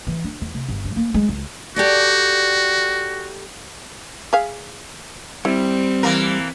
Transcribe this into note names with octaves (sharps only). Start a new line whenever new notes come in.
E3
D4
E2
C3
G1
G2
A#3
G#3
C#2
F#4 G4 A4 D5
G#4 E5 F5
G3 C4 E4
E3 A#3 A#4